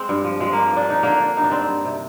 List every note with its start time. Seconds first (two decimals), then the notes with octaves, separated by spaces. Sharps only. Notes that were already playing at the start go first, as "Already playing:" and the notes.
Already playing: G#3 C4
0.09 G2
0.24 F3
0.40 F3 G#3
0.53 G2 A#3
0.73 F3 D4
0.88 F3 D#4
1.03 D3 A#3 D4
1.21 D3
1.37 G2 D#4
1.44 D4
1.51 D3 C4 D#4
1.69 G2
1.85 C3